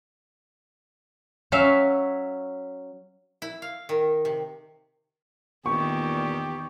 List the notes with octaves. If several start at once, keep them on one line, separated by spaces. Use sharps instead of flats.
F#3 C#4 C#5 E5 F5
E4
F5
D#3
C3
E2 A#2 D#3 G4 C#6